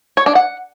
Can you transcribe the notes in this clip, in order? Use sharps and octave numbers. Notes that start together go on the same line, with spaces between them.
C#5
D4
F#5